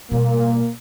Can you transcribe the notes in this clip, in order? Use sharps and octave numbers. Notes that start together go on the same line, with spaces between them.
B2 G3 A#3